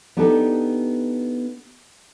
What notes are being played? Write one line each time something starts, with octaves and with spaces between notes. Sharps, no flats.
B3 D4 D#4 G4 A4